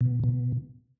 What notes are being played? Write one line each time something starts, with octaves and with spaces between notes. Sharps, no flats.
B2
B2